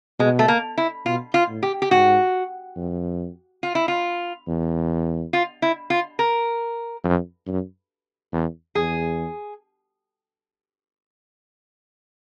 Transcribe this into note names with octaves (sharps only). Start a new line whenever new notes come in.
B2 G#3
A3
A#3
E4
B2 F4
F4
A2
G4
G4
G#2 F#4
F2
F4
E4
F4
E2
F4
E4
F4
A#4
F2
F#2
E2
E2 G#4